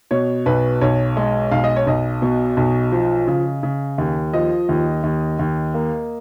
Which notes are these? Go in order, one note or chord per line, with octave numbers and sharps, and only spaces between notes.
B2 C#5
B1 B4
B1 C#5
G#3
B1 F5
D#5
C#5
B1 D#5
B2
B1
F3
C#3
C#3
D#2
F3 D#5
D#2
D#2
D#2
A#3